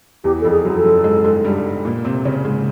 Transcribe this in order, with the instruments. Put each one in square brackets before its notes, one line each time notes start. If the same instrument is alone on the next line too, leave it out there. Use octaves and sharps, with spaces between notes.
[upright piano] E2 E3 [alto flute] G4
[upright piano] F2 F3 [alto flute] A4
[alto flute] G#4
[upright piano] F#2 F#3
[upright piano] F3 [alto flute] A4
[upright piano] F#2 F#3
G#2 G#3
G#2 G#3
G2 G3
A#2 A#3
C3 C4
C#3 C#4
G#2 G#3